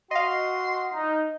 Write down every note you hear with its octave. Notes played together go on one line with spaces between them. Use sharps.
F#4 D#5 F5 C6
D#4